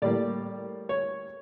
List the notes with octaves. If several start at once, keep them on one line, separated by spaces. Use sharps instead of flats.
A2 G3 A#3 D5
C#5